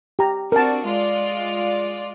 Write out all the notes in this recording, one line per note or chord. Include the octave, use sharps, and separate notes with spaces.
G4 A#5
C4 D4 F#4 A#4 A5
G#3 F4 D5